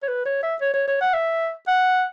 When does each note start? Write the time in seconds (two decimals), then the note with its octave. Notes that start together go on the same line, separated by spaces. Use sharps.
0.03 C#5
0.08 B4
0.26 C#5
0.43 E5
0.61 C#5
0.74 C#5
0.88 C#5
1.01 F#5
1.14 E5
1.68 F#5